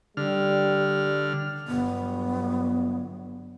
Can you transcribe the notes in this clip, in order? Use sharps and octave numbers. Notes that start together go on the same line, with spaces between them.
D3 G3 F6
G1 F#3 B3